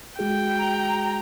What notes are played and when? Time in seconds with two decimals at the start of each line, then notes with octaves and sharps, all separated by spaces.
0.19 G#3 F#4 G#4 G5
0.58 A#5